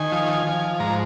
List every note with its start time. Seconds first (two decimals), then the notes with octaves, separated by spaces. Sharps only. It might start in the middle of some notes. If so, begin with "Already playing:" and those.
Already playing: D#3 G#5
0.12 F3
0.47 F3
0.80 G#2 A#5